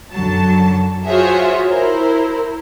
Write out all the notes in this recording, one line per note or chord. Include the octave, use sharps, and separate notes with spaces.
F#2 D3 F#3 A5
F4 F#4 G#4 C5 C#5 E5
E4 A#4 C5